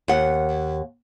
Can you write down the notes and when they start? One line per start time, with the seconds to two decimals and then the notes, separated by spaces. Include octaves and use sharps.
0.08 D#2 F#5